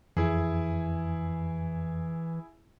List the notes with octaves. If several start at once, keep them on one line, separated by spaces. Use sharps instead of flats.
F2 E3 E4 G#4